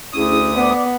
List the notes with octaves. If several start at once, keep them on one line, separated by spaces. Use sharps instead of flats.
D2 C#4 E4 G#4 D#6
B3 D5 D6